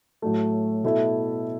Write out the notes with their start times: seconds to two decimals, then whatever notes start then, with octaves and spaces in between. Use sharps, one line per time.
0.22 A2 F#3 A3
0.84 B2 A3 E4 A4 E5